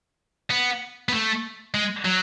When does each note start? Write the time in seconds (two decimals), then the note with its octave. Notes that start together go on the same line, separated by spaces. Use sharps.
0.50 B3
1.09 B3
1.12 A3
1.74 G#3
2.05 F#3